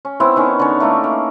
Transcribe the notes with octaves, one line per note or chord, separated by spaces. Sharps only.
C#4
B3 C4 E4
D#3 B3 C#4
D3 C#4
A3 A#3 D#4 E4
A#3